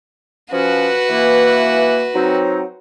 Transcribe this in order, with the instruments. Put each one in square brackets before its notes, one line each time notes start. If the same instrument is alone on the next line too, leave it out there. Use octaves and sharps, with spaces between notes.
[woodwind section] F3 C#4 [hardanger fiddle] F#4 B4
[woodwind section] E3 A#3
F#3 C4 D#4